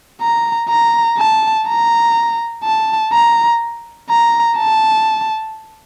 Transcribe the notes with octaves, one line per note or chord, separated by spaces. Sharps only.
A#5
A#5
A5
A#5
A5
A#5
A#5
A5